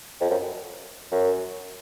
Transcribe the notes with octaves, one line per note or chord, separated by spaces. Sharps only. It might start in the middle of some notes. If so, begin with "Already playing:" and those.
F2
F#2
F#2